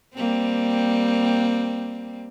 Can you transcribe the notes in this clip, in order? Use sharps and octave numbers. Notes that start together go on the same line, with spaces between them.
G3 A#3 C4